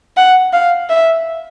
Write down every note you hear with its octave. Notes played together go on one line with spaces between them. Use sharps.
F#5
F5
E5